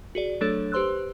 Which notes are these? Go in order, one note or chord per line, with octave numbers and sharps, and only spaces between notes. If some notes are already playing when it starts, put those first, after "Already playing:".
F#4 G#4 D5
F#3 A3 D4 A4 C#5
G4 B4 C5 C6 E6 F#6